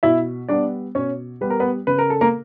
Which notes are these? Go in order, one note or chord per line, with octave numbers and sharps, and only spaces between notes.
B2 E4 E5
G3 B3 D4 D5
B2 C#4 C#5
G3 B3 B4
A#4
B3 B4
C#3 B4
A#4
A4
A#3 A#4